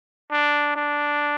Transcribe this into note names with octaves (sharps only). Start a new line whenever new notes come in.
D4
D4